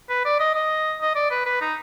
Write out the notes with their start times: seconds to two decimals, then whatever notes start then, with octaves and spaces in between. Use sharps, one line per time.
0.09 B4
0.25 D5
0.40 D#5
0.55 D#5
1.01 D#5
1.15 D5
1.31 B4
1.46 B4
1.61 D#4